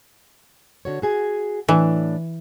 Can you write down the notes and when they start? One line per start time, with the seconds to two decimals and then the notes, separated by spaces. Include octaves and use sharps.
0.85 D3 F#4 C#5
1.02 F#4 G#4 G#5
1.68 A2 E3 D4